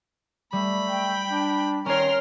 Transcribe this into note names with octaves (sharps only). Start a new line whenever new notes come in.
G3 A3 B5
G5
D4
D#3 C#4 A#4 C#5 C6 F6